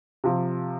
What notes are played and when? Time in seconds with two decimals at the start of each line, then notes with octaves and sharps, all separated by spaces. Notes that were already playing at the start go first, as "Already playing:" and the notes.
0.24 C3 F3